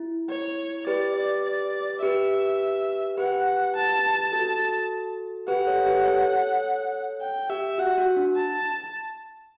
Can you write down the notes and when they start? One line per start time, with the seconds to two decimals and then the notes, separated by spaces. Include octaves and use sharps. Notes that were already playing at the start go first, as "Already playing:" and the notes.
Already playing: E4
0.29 C#5
0.87 G4 B4 D5
1.16 D5
1.45 D5
2.02 G4 B4 E5
3.18 G4 B4 F#5
3.75 A5
4.32 F#4 A4
5.48 G4 B4 F#5
5.67 A4 C#5
5.86 G4 B4
6.05 A4 C#5
7.21 G5
7.49 G4 E5
7.78 F#4 F#5
7.98 F#4
8.17 D4
8.36 A5